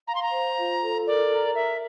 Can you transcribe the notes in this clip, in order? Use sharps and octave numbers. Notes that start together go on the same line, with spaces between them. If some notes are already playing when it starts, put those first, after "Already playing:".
F5 A#5
C6
A#5
C5
F4
A4
A#4 D5
A#5
A#4 E5